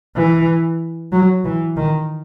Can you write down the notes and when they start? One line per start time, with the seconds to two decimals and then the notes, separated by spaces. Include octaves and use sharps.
0.16 E3
1.12 F#3
1.45 E3
1.76 D#3